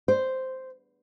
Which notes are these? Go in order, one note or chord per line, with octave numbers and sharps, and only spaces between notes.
C5